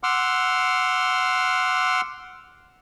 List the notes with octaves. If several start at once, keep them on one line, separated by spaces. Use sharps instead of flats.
F#5 C6 D6 E6 F6